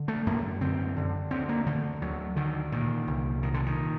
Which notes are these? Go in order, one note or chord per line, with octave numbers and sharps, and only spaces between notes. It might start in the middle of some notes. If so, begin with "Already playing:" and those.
Already playing: D3
A3
F#2 A#3
D3 C4
D3
D2 C4
A#3
D3 A3
D2 F#3
D3 D#3
A#2 D#3
C2
A#2 D#3
D3
D#3